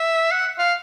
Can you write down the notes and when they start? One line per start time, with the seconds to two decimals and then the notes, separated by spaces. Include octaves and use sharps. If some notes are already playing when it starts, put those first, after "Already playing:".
Already playing: E5
0.31 F#5
0.59 F5